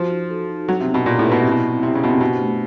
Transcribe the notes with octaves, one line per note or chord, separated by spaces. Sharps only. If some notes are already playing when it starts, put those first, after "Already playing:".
Already playing: F3 F#4
D#4
A4
D#4
F#3 D4
C3
B3
B2
A#2 G4
A2
B4
B2
C3 E4
B2
C4
C3 G4
C#3
B2 C5
C3
B2 D4
A3